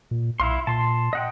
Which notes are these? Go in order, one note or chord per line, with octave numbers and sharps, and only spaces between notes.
A#2
B1 E4 F5 C6
A#2 A5 C6
D#5 F#5 G5